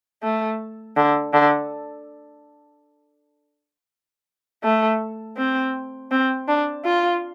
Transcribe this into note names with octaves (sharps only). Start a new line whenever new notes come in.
A3
D3
D3
A3
C4
C4
D4
F4